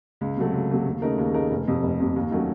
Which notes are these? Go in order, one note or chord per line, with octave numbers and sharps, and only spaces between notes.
C#2
C3 F#3 A3
C#2
C3 F#3 A3
D#2
C#3 A3 D#4 A#4
D#2
C#3 A3 D#4 A#4
F1
F2 C3
F1
F2 C3
D#2
D#3 F#3 A3 C#4